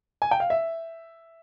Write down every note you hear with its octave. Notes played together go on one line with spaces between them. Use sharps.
G#5
G5
F5
E5